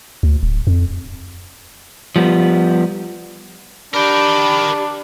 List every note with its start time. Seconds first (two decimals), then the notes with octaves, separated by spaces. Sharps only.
0.23 D2
0.43 D1
0.67 F2
2.16 F3 G3 B3
3.94 D4 G4 A#4 G5 B5